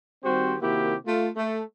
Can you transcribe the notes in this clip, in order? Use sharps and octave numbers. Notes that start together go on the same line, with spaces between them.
D#3 G3 C4 F#4 G4 C5
C3 D#3 A#3 E4 F#4 G4
A3 F4
A3